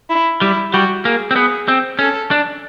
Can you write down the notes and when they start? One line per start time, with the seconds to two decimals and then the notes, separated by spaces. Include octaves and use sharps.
0.10 E4
0.41 G3 E4
0.73 G3 F#4
1.05 A#3 G#4
1.31 C4
1.36 B3 G#4
1.68 C4
1.99 C#4 A4
2.31 D4